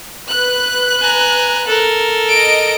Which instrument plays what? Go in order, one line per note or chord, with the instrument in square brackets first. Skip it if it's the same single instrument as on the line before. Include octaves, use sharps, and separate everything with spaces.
[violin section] B4 F#6
[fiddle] G#5 A#5
A4 A#4
[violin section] D#5 D7